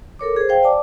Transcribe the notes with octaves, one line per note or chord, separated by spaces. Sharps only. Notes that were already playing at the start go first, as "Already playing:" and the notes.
A4 A#4 C#5 D6
G#4 C5
C5 F5 G5
D5 G#5 A5 D6